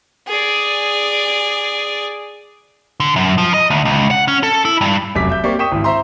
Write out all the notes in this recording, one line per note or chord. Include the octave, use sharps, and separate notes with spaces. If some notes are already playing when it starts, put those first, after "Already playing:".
G#4 D5
D3
F#2
F3
D#5
D2
C#2
F#5
C#4
A4
E4
G2
F1 F#2 D6 B6
E5 G6
A#3 C4 G4 D5 C#6
G5 C#6 D#6 B6 E7
G#1 E3
C5 E5 A#5 C6